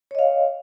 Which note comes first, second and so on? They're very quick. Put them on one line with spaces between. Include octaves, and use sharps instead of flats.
C#5 D#5 F5